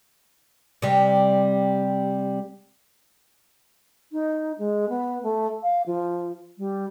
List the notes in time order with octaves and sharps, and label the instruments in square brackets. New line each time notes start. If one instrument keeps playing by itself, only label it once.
[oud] C3 G3
[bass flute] D#4
G#3
B3
A3
F5
F3
G3